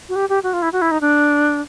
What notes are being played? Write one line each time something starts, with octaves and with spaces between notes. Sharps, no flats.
F#4
G4
G4
F#4
F4
E4
F#4
E4
D#4
D4